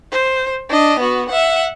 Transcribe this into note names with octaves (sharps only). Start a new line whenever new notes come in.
C5
D4 D#5
B3 F#4
E5 F#5